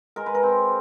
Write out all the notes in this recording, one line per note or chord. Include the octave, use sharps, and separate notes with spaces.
G#3 A#4
B4
A#4
C4